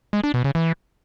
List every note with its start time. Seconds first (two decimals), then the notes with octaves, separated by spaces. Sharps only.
0.13 G#3
0.24 D4
0.34 B2
0.44 C#3
0.55 E3